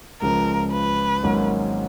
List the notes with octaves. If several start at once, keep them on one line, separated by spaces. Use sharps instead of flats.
C#2 C#3 F3 A#4
B4
G#1 G#2 F#3 A#3 C#4